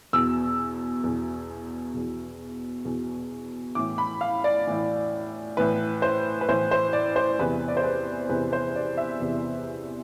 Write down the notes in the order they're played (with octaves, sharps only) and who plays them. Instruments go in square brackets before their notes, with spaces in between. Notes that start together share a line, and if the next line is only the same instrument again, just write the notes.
[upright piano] E2 B2 E6
E2 B2
E2 B2
E2 B2
A2 E3 D6
B5
F5
D5
A2 E3
A2 E3 B4
C5
B4
A2 E3 C5
C5
D5
C5
E2 C3 E3 B4
D5
C5
B4
E2 C3 E3 B4
C5
D5
E5
E2 C3 E3